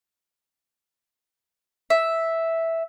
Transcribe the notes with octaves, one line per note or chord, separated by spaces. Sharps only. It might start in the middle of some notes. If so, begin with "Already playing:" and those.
E5